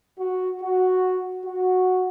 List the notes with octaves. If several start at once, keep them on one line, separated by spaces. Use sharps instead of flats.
F#4
F#4
F#4